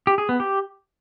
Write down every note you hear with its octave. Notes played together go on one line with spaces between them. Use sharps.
G4
G#4
B3
G4